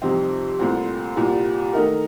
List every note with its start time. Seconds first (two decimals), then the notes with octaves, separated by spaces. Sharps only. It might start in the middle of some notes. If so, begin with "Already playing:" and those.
0.02 F2 C3 G3 C4 D#4
0.59 C2 A#2 A3 C4
1.16 C2 A#2 G3
1.73 D#3 A3 D#4 A#4